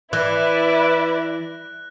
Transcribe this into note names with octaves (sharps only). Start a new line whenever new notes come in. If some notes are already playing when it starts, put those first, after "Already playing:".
E3 E4 B4 D5 F#6 A#6